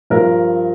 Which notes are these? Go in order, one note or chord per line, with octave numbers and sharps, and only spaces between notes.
G2 F3 A#4